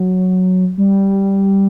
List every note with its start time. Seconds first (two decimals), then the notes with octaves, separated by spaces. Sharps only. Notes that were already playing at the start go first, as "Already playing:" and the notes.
Already playing: F#3
0.78 G3